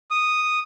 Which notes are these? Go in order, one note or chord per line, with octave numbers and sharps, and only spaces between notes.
D#6